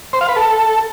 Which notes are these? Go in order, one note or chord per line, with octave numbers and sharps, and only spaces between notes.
C5
F5
B4
A4